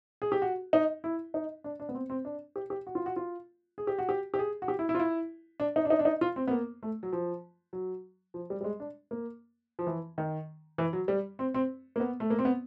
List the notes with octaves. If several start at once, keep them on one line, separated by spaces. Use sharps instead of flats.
G#4
G4
F#4
D#4
E4
D#4
D4
D4
B3
C4
C4
D4
G4
G4
F#4
F4
F#4
F4
G#4
G4
F#4
G4
G4
G#4
F#4
G4
E4
E4
F4
E4
D4
D#4
D4
D#4
D4
D#4
F4
C4
B3
A#3
A3
F#3
F3
F#3
F3
G3
G3
G#3
D4
A#3
F3
E3
D#3
E3
F#3
G3
C4
C4
A#3
B3
A3
A#3
C4
B3